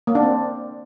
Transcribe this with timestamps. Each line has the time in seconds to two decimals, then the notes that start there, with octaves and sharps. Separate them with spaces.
0.07 A#3
0.15 D4
0.23 C4